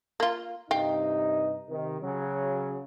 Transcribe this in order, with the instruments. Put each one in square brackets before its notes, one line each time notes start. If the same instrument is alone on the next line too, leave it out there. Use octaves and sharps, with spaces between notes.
[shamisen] A#3 F4
[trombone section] G2 C3 D#4 [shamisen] F5 G5
[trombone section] C3 D#3
C#3 F#3